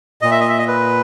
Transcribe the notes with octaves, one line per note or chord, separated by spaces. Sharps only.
A#2 D#5
E5
D#5
E5
D#5
B4